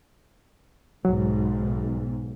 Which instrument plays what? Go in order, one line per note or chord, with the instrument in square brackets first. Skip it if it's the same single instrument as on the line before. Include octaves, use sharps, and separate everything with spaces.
[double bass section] B1 G#2 [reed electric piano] F#3